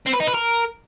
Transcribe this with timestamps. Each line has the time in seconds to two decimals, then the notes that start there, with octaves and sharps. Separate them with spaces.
0.06 C4
0.13 B4
0.20 D#4
0.27 B4
0.34 A#4